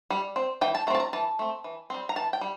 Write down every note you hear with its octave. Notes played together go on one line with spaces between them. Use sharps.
G3
C4
E3 G5
A5
A3 C4 A5 A#5
A#5
E3 A5
A3 C4
E3
G3 C4
A#5
E3 A5
G5
G3